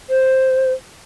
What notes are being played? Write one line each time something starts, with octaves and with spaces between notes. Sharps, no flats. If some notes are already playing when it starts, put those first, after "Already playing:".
C5